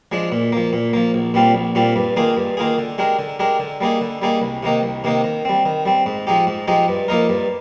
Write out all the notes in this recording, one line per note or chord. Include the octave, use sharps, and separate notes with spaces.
F3 G#3 D4
A#2
F3 A#3
A#2
F3 A#3
A#1
A#2 G3 C4 F4
A#1
A#2 G3 C4 F4
G2
D#3 A#3 F4 G#4
G2
D#3 A#3 F4 G#4
D3
G#3 D4 G4 A#4
D3
G#3 D4 G4 A#4
D3
G3 A#3 D#4 G#4
D3
G3 A#3 D#4 G#4
C2
C3 D#3 A#3 D#4
C2
C3 D#3 A#3 D#4
D#3
G3 C4
D#3
G3 C4
G#2
F3 G#3 D#4 G4
G#2
F3 G#3 D#4 G4
G2
F3 A#3 D#4 A#4
G2